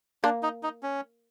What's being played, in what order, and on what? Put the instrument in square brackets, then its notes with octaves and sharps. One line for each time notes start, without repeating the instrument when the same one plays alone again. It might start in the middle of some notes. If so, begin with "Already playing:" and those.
[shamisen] A#3 [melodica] D4
[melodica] D#4
D#4
C#4